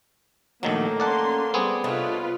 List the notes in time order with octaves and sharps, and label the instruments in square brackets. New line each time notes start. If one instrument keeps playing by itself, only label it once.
[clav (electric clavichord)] A#1 D#3 F#3 [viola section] A3 D#4 [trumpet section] A#3 [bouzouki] A4
[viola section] C#4 C6 [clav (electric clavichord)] D5 F#5 A5
[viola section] G3 D5 C6 [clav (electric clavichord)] B3 C4 G#4
[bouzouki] C3 A3 D4 [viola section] F4 B4 F5 [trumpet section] C#5 D#5